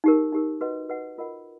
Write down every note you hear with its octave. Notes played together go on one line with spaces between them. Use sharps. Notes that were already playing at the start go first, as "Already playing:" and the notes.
D#4 G4 A#4
D#4 G4 A#4
F#4 B4 D#5 F#5
F#4 B4 D#5 F#5
F4 A#4 D#5 F#5